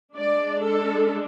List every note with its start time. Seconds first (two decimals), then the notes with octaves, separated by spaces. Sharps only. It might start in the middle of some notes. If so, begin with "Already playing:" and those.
0.16 G#3 D4 D5
0.62 A4